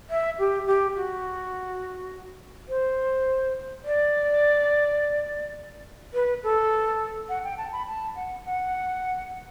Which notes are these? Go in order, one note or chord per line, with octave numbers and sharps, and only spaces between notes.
E5
G4
G4
F#4
C5
D5
B4
A4
F#5
G5
A5
B5
A5
F#5
F#5